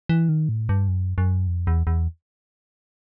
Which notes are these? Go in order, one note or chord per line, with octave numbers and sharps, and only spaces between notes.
E3
D#3
A2
G2
F#2
F#2
F2
E2
E2